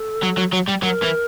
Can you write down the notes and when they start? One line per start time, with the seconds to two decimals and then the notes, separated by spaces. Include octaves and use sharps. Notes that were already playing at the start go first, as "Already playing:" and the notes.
Already playing: A4
0.23 F#3
0.38 F#3
0.53 F#3
0.68 G3
0.82 F#3 A#4
1.02 E3